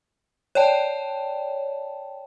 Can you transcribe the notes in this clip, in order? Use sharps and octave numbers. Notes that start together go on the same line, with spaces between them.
C#5 D5 G5 A5